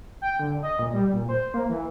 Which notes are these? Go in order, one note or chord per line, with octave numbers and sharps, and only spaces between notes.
G5
D3
D#5
A#2
G3
A#2
C5
A#3
E3